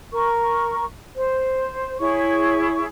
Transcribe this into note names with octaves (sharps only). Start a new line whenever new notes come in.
A#4 C#6
C5
E4 G#4 C#5 C#6